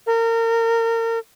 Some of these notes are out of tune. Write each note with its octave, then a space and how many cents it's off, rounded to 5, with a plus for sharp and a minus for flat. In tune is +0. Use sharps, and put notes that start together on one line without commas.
A#4 -30